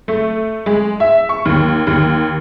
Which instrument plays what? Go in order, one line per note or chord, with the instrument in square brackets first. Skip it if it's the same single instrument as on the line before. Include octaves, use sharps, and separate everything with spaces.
[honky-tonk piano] A3
G#3
E5
C#6
D#2
D#2